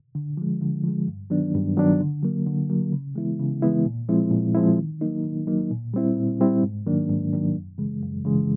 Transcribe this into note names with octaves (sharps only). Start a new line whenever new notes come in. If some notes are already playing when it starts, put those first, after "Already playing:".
D3
F3 G#3
D3
F3 G#3
G2
D#3 F#3 B3 D4
G2
D#3 F#3 B3 D4
D3
F#3 A#3
D3
F#3 A#3
C#3
E3 G#3 B3 E4
C#3
E3 G#3 B3 E4
A#2
F3 G#3 C4 E4
A#2
F3 G#3 C4 E4
D#3
F#3 A#3 D#4
D#3
F#3 A#3 D#4
A#2
G3 C4 E4
A#2
G3 C4 E4
G#2
D#3 F#3 A#3 D4
G#2
D#3 F#3 A#3 D4
F#2
C#3 E3 G#3
F#2
C#3 E3 G#3